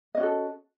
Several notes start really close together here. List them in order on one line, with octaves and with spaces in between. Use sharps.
D#5 C#4 F#4 A4